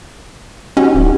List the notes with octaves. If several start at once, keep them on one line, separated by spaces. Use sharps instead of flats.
C#4 D#4 F#4 G4
D1